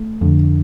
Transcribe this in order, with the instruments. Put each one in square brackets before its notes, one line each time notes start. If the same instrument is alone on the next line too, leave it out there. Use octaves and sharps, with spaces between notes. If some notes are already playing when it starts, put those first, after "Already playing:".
Already playing: [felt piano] A3
[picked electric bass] F2 [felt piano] D3